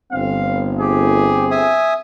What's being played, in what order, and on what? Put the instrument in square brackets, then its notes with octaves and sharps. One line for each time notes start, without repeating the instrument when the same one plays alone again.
[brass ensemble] G1 [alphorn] C4 [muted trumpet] F5
[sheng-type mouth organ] G4 [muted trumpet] G#4
[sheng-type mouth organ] E5 G#5 D#6